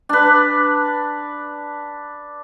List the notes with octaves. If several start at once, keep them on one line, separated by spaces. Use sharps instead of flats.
D4 B4